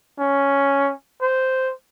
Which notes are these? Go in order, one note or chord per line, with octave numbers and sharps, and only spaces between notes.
C#4
C5